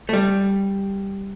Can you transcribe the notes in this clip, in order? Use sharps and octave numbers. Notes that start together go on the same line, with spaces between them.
A3
G3